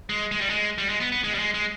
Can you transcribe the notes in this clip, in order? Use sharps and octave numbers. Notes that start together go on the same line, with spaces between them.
G#3
G#3
G3
G#3
G3
G#3
B3
B3
G#3
G3
G#3
G#3